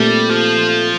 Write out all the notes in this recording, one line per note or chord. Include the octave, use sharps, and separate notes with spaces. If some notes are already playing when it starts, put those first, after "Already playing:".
Already playing: A#2 G3 A3 C4 G4
F3